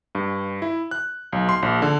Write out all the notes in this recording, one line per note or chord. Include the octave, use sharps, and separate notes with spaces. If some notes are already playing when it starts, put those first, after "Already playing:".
G2
E4
F#6
B1
C6
A#1
D3